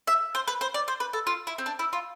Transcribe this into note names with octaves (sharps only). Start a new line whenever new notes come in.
E5
C5
B4
C5
D5
C5
B4
A4
F4
E4
C4
D4
E4
F4